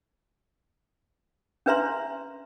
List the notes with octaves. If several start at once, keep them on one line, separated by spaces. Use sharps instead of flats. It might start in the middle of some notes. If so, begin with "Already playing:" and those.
C#4 D4 B4 E5 A#5 C6